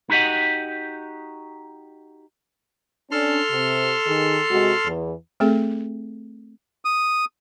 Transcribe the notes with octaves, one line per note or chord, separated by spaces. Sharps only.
D#4 F#4 G4 D#5 F#5
C#4 D4 A4 C6 F6
C3
D#3 G#4
C3 G#3 F#4
E2
A3 C4 G#4 A4
D#6